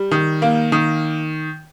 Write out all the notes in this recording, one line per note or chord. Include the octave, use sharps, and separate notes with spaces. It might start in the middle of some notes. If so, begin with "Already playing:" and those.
Already playing: G3
D#3
A#3
D#3